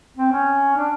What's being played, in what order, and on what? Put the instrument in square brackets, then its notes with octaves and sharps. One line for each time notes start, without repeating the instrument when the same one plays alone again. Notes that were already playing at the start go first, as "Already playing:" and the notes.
[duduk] C4
C#4
D4